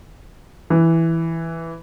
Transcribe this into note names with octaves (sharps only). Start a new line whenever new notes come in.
E3